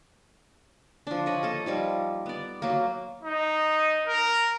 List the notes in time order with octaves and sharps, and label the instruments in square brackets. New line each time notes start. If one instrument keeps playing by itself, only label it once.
[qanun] F3 D4
C#5 D#5 B5
A#3 A4 D#5
F3 G3 D#4 F4
B3 D5
F#3 A#3
[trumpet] D#4
A#4